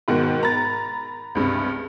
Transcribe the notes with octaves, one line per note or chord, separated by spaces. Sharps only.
G#2 B2 D#3 F#4
A#5 B5 A6
C#2 G2 C3